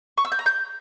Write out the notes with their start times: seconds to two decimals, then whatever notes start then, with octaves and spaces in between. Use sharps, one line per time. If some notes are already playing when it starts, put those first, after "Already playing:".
0.18 C#6
0.25 E6
0.32 G6
0.39 A#5
0.46 G6